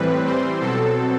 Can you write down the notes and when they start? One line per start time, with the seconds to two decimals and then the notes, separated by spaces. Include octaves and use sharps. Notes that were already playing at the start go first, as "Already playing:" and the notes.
Already playing: A2 E3 G3 C4 B4
0.26 E3 G3 C4 C5
0.61 B2 F#3 C4 A4